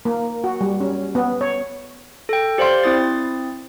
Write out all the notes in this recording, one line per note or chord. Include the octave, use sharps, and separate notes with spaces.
A#3
F#4
G3
C#4
B3
C#5
A4 G5
G4 C5 D5 F5 C6
C4 E4 D#6 A6